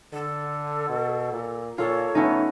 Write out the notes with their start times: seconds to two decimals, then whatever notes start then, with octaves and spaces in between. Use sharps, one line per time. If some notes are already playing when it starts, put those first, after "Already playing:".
0.13 D3 A4
0.89 B2
1.32 A#2
1.78 A#2 F4 A4 C#5
2.15 A3 B3 C#4 D#4